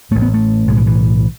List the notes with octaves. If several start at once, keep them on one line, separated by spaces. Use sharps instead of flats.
A1 A2 A3
B3
A3
B1 A2 G#3
E3
E3